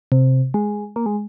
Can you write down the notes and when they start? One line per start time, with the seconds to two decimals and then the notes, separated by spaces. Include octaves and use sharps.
0.12 C3
0.54 G#3
0.96 A#3
1.06 G#3